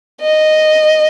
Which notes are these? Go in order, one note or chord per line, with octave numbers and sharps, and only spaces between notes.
D#5